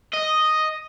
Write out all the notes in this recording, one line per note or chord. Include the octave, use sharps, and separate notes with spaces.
D#5